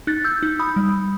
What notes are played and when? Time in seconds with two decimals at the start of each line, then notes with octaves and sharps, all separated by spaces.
0.07 D#4 F#6 A6
0.24 E6 G6
0.43 D#4
0.59 B5 D#6
0.76 G3